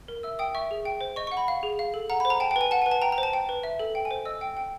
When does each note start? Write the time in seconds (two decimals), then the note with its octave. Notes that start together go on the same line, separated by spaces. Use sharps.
0.08 A#4
0.23 E5 E6
0.39 G5 D#6
0.55 E5 C#6
0.71 G#4
0.85 G5
1.01 C5
1.16 D#5 C#6
1.27 C#6
1.32 F#5
1.37 B5
1.48 F5
1.63 G#4
1.79 F5
1.94 A4
2.10 F#5 A#5
2.20 B5
2.25 C5
2.30 A#5
2.40 G5 A5
2.51 G5
2.56 B4 G#5
2.71 F#5 A5
2.82 G#5
2.86 B4
2.91 A5
3.02 G5 A#5
3.12 A#5
3.18 C5
3.23 A5
3.33 G5
3.49 B4
3.63 E5
3.79 A4
3.95 G5
4.05 G#5
4.11 C5
4.25 D#5 E6
4.41 G5
4.57 G5